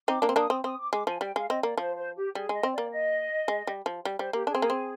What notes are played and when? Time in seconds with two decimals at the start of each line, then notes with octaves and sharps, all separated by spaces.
0.08 C4 D#4 D6
0.22 A#3 D4
0.29 C4
0.36 A#3 D4 D#6
0.50 C4
0.64 C4 D#6
0.79 D6
0.93 G#3 D6
1.07 F3 G#5
1.21 G3 G5
1.36 G#3 F5
1.49 C4 D#5
1.63 A#3 D5
1.78 F3 C5
1.97 C5
2.17 G4
2.35 G3 G#4
2.49 G#3 D#5
2.63 C4
2.73 D5
2.78 A#3
2.92 D#5
3.48 G#3
3.67 G3
3.86 F3
4.05 G3
4.19 G3 C5
4.33 A#3 G4
4.47 D4 G#4
4.55 C4
4.62 A#3
4.70 C4